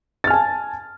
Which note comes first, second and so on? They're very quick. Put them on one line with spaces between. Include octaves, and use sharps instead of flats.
A6 F6 G#5 A5